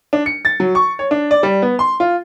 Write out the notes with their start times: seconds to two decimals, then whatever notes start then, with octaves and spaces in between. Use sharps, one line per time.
0.13 D4
0.26 C#7
0.45 A6
0.60 F#3
0.75 C#6
0.99 C#5
1.11 D4
1.31 D5
1.43 G3
1.62 B3
1.79 C6
2.00 F4